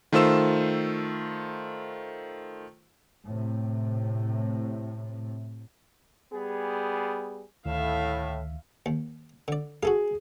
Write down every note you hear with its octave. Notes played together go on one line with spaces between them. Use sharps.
D#3 A3 F4 C5 E6 E7
A2 C3
G3 B3 G#4
D2 A2 D#3 E5 F5
D#2
D3 D5
F#4 G#4 A4 F5